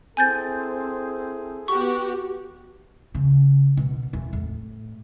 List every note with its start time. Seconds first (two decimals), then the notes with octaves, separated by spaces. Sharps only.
0.17 C4 E4 G#4 A4 G#5 G6 A6
1.68 B3 F#4 G4 C#6
3.15 C#3
3.77 B2 D#3
4.13 E1 E2
4.33 A2